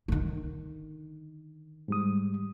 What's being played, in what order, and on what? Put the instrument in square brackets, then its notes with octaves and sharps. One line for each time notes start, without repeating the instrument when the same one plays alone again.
[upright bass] D3 D#3
[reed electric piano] G#2 G3 D#6